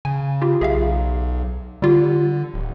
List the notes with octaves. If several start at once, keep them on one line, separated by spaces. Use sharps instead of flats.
C#3 G#5
F4 G4
B1 G#4 E5 F5
D3 G3 F4 G4
D1